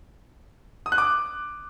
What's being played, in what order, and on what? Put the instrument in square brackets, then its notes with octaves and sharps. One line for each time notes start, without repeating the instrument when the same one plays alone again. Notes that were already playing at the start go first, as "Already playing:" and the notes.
[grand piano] D#6
F#6
D6